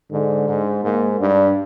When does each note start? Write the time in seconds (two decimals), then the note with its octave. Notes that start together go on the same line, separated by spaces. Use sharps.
0.11 G#2 D3
0.48 G#2
0.84 G#2 A#3
1.21 G2 D4